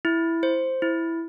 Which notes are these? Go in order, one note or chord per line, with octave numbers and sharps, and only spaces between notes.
E4
C5
E4